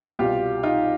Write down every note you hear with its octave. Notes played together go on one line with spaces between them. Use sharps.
C2 B2 G3 F4 G4
D#4 F4